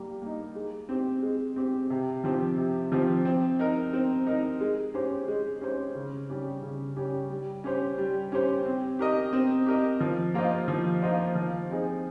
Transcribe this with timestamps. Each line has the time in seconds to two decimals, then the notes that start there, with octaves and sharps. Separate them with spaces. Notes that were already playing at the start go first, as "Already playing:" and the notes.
Already playing: G3 A#3
0.22 A#3 D#4
0.55 G#3
0.89 C4 G4
1.22 G#3
1.56 C4 G4
1.90 C3
2.24 F3 C4 G4
2.58 C3
2.92 F3 C4 G4
3.25 C4
3.59 D#4 A#4
3.93 C4
4.27 D#4 A#4
4.61 G#3
4.94 C#4 G4 C5
5.28 G#3
5.61 C#4 G4 C5
5.95 C#3
6.29 G3 C#4 G4
6.63 C#3
6.96 G3 C#4 G4
7.30 G3
7.64 C#4 G4 C5
7.98 G3
8.32 C#4 G4 C5
8.66 C4
8.99 G4 A#4 D#5
9.33 C4
9.66 G4 A#4 D#5
10.01 F3
10.34 A#3 F4 C5 D#5
10.68 F3
11.02 A#3 F4 C5 D#5
11.35 F3
11.70 C4 D#4 G#4 C5